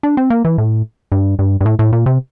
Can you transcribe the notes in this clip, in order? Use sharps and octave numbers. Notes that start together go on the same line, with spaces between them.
D4
C4
A#3
E3
A2
G2
G2
G2
A2
A2
A#2
C3